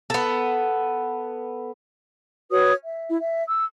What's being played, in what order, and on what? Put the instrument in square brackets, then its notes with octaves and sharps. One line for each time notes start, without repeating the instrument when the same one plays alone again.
[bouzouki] B3 A4
[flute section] F#4 B4 C#5 D#6
E5
E4
E5
E6